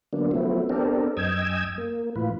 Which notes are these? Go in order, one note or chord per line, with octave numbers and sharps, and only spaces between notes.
D3 F#3 A#3 B3 D4
F3 F#3 A3 B3 C4 E4
B3 C4 D4 G4 A4 A#4
F#2 D#5 G5 G#5 E6 G#6
A#3
A2 E3 F4 B4